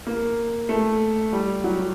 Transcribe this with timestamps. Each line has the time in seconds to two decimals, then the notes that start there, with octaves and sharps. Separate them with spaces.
0.07 A#3
0.69 A3
1.33 G3
1.64 F#3